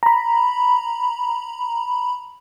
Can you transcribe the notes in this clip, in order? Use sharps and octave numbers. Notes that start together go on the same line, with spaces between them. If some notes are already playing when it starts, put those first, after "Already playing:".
A#5 B5